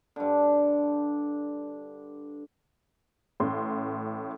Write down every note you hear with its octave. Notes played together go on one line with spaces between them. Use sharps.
G2 D3
A1 A2 C6